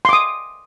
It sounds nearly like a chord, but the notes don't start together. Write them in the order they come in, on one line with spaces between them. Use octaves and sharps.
C6 D6 D#6